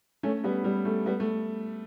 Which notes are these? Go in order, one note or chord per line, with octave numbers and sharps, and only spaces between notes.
A3 C#4
G3 B3
G3
A3
G3 B3
A3